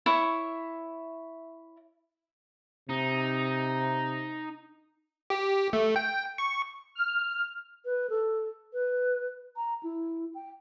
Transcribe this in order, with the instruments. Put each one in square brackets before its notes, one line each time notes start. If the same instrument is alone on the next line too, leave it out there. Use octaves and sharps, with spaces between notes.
[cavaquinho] E4 C#5 E5
[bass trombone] C3 [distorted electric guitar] D#4
[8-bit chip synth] G4
A3
G5
C#6
[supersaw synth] F6
[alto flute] B4
A4
B4
A#5
E4
G5